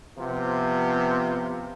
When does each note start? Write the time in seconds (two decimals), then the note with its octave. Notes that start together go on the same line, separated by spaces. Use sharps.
0.17 C3 F3 B3 F4